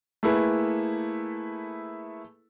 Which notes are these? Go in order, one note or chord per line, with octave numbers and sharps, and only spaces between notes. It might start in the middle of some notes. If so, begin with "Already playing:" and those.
A3 A#3 E4 G#4 A4 B4